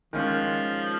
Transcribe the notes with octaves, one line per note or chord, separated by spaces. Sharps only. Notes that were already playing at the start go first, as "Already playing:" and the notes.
D#3 F3 G#3 C#4 F4